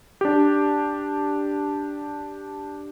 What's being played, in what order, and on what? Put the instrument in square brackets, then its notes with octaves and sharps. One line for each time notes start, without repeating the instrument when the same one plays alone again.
[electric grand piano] D4 G4